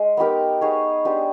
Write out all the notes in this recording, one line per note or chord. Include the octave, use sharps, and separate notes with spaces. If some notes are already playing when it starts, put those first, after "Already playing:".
Already playing: G#3
B3 D#4 G4 A#4
B3 D#4 G#4 C#5
B3 D4 G4 C5